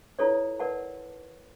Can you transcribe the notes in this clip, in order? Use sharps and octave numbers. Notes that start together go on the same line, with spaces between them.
E4 F4 A4 B4 C#5 D5
A#4 B4 D5 F#5 A5